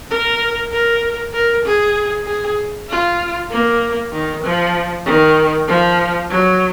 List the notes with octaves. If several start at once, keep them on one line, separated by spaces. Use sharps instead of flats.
A#4
A#4
A#4
G#4
G#4
F4
A#3
D#3
F3
D#3
F3
F#3